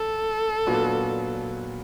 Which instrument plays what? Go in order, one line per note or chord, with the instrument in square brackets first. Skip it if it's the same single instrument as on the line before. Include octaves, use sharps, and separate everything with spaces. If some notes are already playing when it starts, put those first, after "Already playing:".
Already playing: [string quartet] A4
[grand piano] A#2 F#3 B3 D4 F#4